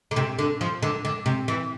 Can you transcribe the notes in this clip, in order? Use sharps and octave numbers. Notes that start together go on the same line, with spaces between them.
D3
C3
D3
F3
D3
D3
C3
E3